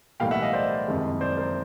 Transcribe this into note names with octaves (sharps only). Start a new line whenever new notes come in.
B1 A2 E3 G3 A#3 F5 G5
E5 F#5
D#5 F5
C5 D5
F#1 F2 C3 D#3 G#3
C5 D5
A#4 C5